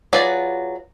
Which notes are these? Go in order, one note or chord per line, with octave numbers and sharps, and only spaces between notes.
F#3 F4 G#4 B4 D5